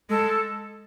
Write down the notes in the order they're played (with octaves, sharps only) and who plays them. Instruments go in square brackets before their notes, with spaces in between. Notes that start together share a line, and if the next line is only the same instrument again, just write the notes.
[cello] G#3 [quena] A4